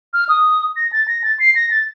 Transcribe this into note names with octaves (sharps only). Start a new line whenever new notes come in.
F6
D#6
A#6
A6
A#6
A6
C7
A#6
A6